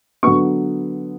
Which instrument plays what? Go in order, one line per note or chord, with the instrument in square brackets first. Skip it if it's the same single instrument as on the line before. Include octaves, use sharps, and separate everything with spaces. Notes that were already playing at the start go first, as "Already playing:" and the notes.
[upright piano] D3 F#3 B3 C#6